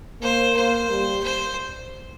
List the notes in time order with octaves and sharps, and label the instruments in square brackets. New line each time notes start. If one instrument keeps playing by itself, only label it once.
[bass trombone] A#3 [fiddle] C5
[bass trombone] A#3 [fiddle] C5
[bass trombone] G3
[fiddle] C5